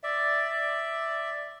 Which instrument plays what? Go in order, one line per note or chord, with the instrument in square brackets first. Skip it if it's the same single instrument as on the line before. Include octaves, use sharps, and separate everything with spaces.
[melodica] D5 E5